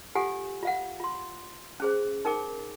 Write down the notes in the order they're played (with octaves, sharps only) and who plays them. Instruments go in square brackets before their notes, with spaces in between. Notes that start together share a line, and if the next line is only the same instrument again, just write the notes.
[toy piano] F4 G4 A4 F#5 G#5
F4 F5 F#5
F4 C6
C#4 G#4 C5
D#4 A#4 G5 D6